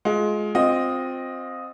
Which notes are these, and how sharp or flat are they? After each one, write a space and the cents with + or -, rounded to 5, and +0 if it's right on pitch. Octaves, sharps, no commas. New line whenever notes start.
G#3 +20 F4 +20
C4 +0 F4 +25 D#5 +0